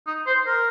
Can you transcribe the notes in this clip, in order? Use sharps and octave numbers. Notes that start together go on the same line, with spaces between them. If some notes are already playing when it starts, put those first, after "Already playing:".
D#4
C5
A#4